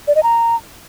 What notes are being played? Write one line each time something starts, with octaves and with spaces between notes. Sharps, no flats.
D5
D#5
A#5